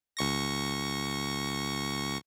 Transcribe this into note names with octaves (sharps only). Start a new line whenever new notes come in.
C#2 C#6 A#6